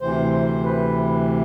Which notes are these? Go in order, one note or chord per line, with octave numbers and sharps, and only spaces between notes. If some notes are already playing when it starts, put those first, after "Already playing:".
D2 C3 E3 C5
C5
B4